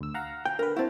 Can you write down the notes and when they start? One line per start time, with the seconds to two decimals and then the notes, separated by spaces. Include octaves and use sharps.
0.01 D2 E6
0.14 F5 F#5 A#5
0.45 G5
0.59 D3 A#4 B4
0.76 C4 E4 F#4 A5